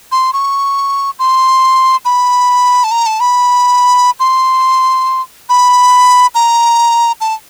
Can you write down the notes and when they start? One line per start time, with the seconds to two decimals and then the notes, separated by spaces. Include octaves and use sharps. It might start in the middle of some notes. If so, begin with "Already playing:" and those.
0.12 C6
0.33 C#6
1.19 C6
2.05 B5
2.84 A5
2.91 A#5
3.06 A5
3.20 B5
4.20 C6
5.49 B5
6.35 A#5
7.21 A5